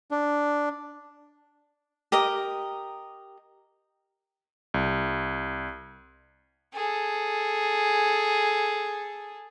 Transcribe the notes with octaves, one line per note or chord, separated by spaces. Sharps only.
D4
G4 A#4 D#5
C2
G#4 A4